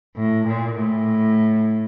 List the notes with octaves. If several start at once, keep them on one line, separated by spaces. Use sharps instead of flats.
A2
A#2
A2